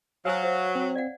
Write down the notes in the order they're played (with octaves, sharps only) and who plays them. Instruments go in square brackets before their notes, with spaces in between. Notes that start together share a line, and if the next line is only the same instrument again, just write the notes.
[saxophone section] F#3 [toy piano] C5 G#5 E6 [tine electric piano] F5
[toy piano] C5 C#5 E5
[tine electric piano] C4
[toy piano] D5 F5 F#5